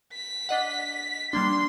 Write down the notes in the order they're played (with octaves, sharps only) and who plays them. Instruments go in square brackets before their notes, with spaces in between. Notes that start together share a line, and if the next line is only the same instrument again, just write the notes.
[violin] B6
[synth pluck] D4 D#5 F#5
[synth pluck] G3 A#3 D4 [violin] C6